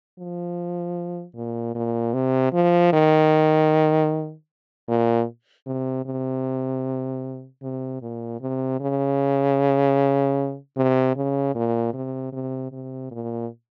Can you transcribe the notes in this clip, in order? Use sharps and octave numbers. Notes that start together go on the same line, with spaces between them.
F3
A#2
A#2
C3
F3
D#3
A#2
C3
C3
C3
A#2
C3
C#3
C3
C#3
A#2
C3
C3
C3
A#2